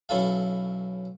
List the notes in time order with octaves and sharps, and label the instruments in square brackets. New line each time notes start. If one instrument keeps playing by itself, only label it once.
[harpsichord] B1 C#4 E4 A4 F5